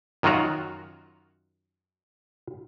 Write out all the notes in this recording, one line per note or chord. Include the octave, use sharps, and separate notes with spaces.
F#2 D#3 F#3 F4 F#4 A#5